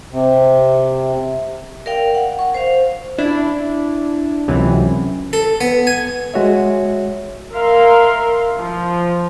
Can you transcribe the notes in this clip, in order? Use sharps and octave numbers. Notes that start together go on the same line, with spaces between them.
C3
A#4 D5 F5 G5
F#5
C#6
C5 F5
D4 E4
C#2 F#2 C3 E3
A4
B3
G#5
G#3 F#4 C#5 E5
A#4 E5 F5 C6
F3